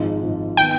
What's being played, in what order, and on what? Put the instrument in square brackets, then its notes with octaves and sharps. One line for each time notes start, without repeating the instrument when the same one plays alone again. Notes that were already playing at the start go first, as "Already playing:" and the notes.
Already playing: [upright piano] G#1 G#2 F3
G#1 G#2 F3
[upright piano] D#3 B3 [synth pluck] G5